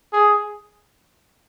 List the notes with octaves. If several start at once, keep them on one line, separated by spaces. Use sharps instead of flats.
G#4